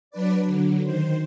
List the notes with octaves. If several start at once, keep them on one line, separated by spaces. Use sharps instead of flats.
F#3 D4 B4 D5
D3 F#3
D#3 C5